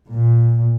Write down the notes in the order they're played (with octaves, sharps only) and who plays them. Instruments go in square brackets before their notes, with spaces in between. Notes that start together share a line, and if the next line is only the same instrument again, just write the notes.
[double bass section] A#2